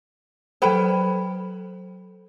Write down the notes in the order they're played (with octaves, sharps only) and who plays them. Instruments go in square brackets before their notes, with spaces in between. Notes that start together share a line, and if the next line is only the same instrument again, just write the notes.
[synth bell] F#3 A4 C5 [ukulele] B4 G5 B5